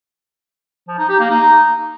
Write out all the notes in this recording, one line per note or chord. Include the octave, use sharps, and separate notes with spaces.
F3
D#4
G4
A#3
D#4